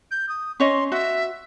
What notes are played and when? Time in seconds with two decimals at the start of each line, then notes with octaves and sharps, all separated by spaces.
0.11 G6
0.29 D#6
0.60 C#4 C#5 D#5 C6
0.92 F#4 E5